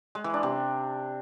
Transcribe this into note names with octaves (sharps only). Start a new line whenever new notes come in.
G#3
E3
D4
C3